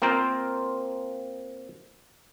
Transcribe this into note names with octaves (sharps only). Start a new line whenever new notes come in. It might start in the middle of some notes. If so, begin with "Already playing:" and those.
A#3 C4 F4 A#4 C5